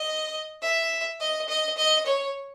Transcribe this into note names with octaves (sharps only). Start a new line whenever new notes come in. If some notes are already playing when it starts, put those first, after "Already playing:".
Already playing: D#5
E5
D#5
D#5
D#5
C#5